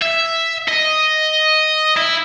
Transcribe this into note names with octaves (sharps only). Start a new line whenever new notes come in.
E5
D#5
E4